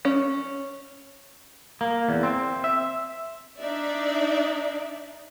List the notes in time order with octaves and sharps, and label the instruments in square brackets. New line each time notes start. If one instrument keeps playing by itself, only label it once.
[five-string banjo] C#4
[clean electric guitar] A#3
E2
C4
E5
[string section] D4 D#4 D5 E5